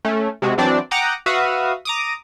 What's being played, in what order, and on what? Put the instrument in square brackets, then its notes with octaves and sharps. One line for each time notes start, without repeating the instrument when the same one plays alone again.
[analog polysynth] A3 C#4
C3 G#3 F#4
E3 F#3 C4 D4 D5
F#5 G5 A#5 D6 D#6
F#4 B4 E5 F5 D#6
A#5 D6 D#6